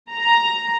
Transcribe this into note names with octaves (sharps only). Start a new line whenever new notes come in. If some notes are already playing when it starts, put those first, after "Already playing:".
A#5